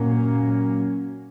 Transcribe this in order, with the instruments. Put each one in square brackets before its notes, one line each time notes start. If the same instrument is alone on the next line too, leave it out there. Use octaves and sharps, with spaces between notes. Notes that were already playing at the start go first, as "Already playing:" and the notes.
Already playing: [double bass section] A#2 F#3 A#3 C#4